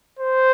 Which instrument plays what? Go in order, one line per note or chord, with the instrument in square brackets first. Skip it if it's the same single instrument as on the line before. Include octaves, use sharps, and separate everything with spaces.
[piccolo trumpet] C5